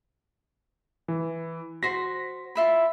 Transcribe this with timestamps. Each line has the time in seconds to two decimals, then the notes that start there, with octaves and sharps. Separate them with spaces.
1.08 E3
1.83 F#4 C5 A#6 B6
2.55 F4 E5 B5